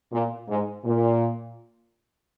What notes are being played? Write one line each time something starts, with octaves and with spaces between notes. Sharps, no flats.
A#2
G#2
A#2